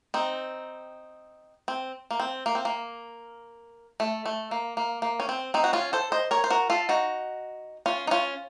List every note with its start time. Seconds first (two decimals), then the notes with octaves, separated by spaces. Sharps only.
0.14 C4 D#4
1.68 C4
2.11 A#3
2.20 C4
2.46 A#3
2.55 C4
2.65 A#3
4.00 A3
4.26 A3
4.51 A#3
4.77 A#3
5.02 A#3
5.20 C#4
5.29 C4
5.54 C4 D#4
5.64 F#4
5.73 C#4 F4
5.93 A4 C5
6.12 C5 D#5
6.31 A#4 C#5
6.44 C5
6.50 F#4 A#4
6.70 F4 A4
6.89 D#4 F#4
7.86 C#4 F4
8.07 D#4
8.11 C#4 F4